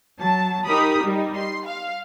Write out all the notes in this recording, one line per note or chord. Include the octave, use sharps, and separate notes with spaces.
F#3 A5
D#4 G4 A#4 B5 D#6
G3 D#4
C6
F5